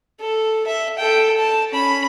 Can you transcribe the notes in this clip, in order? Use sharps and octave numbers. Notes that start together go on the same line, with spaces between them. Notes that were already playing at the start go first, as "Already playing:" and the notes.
A4
E5
A4 G5
A5
C#4 B5